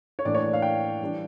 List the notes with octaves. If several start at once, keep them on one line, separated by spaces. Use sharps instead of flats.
C#5
A2 E3 A#3 D4 D5
C#5
D5
F5
G5
E3 G3 D4